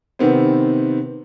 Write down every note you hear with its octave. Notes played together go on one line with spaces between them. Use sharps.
C3 D#3 B3 C4